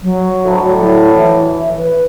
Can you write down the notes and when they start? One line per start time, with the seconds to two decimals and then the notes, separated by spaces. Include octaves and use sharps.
0.03 F#3
0.45 D2 A2
0.83 E4
1.15 E3
1.77 B4